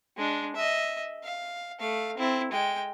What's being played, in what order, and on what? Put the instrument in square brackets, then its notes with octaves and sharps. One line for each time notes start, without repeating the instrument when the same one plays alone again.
[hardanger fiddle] G#3 D4
D#5 E5
F5
A3 F5
C4 E4
G#3 G5